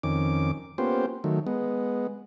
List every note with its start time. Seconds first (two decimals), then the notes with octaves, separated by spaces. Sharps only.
0.03 F2 D#3 C#4 D6
0.78 A#3 B3 C#4 F4 G4 C5
1.24 D#3 F#3 A3
1.47 G#3 B3